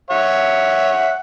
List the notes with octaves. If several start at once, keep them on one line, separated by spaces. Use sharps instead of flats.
C#5 E5 F#5